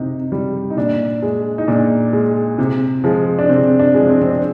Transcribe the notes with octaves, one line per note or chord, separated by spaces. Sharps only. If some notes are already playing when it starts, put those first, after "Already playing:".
Already playing: C3 D#4
G3
D#4
A#2 D4
G#3
D#4
A#2 D4
G#3
C3
F3 G#3
D4
C3 C4
D4
F3 G#3
C4
C4
D4